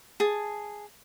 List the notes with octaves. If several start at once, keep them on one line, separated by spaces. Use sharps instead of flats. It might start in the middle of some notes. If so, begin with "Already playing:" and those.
G#4 A5